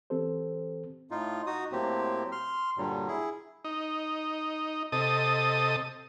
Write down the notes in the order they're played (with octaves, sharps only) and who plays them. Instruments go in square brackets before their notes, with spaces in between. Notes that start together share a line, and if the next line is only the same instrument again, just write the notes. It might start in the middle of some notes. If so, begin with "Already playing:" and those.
[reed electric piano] E3 C4 G4 A4 C5
[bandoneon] A2 D#4 F4
D#4 F#4 D#6
A2 F#3 A#3 C4 G4
C6 F6
G2 A#2 D3 F#3 G3
E4 G#4
[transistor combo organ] D#4
C3 A4 D#5 D#6